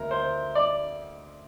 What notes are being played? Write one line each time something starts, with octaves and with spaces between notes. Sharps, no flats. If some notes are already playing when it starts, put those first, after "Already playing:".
Already playing: D2 A#4
C5
D5